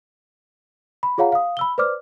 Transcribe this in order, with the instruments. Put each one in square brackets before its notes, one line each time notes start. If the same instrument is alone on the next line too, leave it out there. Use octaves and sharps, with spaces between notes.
[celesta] B5
F4 G#4 C#5 F5 F#5 A#5
F5 D#6
B5 E6 G7
B4 C5 D5 D6 F6